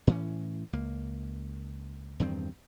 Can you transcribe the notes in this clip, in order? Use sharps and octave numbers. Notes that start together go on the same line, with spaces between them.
A2 E3 C#4
C#2 A#3
E2 G2 D#3 C4